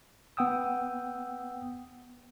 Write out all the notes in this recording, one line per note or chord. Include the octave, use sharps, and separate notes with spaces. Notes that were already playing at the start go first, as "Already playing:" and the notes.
B3 F#5 G5 D#6 E6